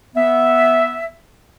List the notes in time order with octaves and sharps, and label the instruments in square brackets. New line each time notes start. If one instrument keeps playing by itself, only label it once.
[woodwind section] B3 E5